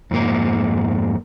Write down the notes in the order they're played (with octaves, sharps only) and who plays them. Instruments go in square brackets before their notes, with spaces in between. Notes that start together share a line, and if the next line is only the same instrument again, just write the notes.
[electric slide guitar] F2 G#2 A#3